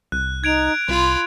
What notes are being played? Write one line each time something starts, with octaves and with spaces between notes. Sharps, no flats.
C2 F#6
D#4 G#6 D7 F7
C2 F4 B5 C6